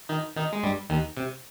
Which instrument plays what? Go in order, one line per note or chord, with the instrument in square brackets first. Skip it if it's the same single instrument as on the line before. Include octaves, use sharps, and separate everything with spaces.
[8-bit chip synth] D#3 D#4
D#3 D#4
G#3
G2 G3
D#2 D#3
C3